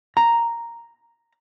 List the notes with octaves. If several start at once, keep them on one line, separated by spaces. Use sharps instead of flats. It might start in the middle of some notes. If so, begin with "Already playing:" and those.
A#5